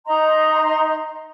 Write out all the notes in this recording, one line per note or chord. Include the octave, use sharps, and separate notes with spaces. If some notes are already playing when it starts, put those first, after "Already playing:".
D#4 D#5 A#5 C6